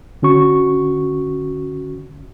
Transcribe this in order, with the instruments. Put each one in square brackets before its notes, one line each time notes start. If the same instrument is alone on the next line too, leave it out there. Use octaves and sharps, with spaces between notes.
[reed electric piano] D3 C#4 F#4 C#6